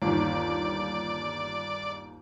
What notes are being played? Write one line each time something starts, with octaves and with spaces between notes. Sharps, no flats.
G1 D#2 D5